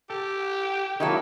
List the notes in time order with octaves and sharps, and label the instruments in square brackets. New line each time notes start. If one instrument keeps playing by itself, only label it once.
[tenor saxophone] G4 [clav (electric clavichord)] A4
[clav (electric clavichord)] D#3 F#3 A#3 [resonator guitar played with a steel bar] D#4 E4 A4